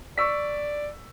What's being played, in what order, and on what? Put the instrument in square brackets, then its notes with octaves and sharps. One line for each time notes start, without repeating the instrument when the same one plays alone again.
[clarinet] D5 [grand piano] C#6 E6 B6